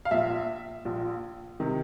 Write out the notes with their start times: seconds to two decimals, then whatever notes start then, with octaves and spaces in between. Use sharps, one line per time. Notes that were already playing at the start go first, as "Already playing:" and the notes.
0.05 F5
0.11 A#1 A#2 E5
0.85 A#1 A#2
1.60 C3 D#3